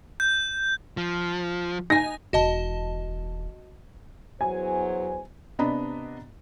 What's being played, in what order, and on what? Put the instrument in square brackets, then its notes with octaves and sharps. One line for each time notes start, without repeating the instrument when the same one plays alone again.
[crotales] G6
[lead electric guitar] F3
[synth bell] D#4 G#5 [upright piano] A#6
[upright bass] E1 E3 [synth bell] F#4 D#5 A5
[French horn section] E2 F#3 C5 [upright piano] G#5
[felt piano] C3 B3 D4 D#5 A#5 B5